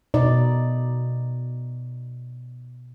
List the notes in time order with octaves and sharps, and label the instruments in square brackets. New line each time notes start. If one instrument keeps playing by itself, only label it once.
[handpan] B2 D#4 D5